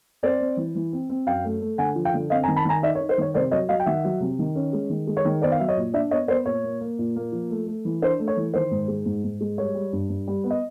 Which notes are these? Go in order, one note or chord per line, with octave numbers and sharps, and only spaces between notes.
C4 C5 D5
C4
E3
E3
C4
C4
F#2 F5 G5
A3
A3
D3 F#5 G#5
F3
F5 G5
D3
C4 D#5 F5
G#5 A#5
D#3
A5 B5
D#3 G#5 A#5
D#4 D5 E5
C#5
D#4
C5
D#3 C#5
C3 C5 D5
F#3 C#5 D#5
F#3 D#5 F5
G5
D#3 E5 F#5
F#3
C3
D#3
C#4
G#3
D#3
G#3
C#5
D#3
B3 C5 D5
F5
F#3 E5
C#5 D#5
A#2
D4 D5 E5
B3 C#5 D#5
B3 C5 D5
A#2 C#5
A#3
A#3
A#2
A#3
F3
A3
A3
E3
D4 C5
A3
C#5
E3
D#3 C5
G#2
G#3
G#2
G#2
G#3
G3 C#5
G3
G2
G2
G3
B3
D#5